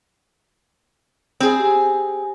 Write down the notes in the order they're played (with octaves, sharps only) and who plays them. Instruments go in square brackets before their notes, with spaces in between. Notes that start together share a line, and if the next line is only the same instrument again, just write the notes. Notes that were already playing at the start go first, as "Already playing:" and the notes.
[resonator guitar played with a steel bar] C4 G#4
[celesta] G4 G#5